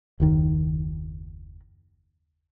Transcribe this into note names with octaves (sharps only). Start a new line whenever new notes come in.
F#1 D#2 D#3